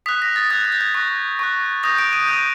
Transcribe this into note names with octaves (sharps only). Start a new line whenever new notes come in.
D#6 F#6 B6
A#6
A6
D#6 F#6 G#6
G6
A6
G#6
C#6 F#6 A#6
C#6 F#6
D#6 G6 A#6
D7
D#7
D#6 G6